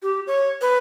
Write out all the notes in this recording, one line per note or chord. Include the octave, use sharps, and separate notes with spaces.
G4
C#5
B4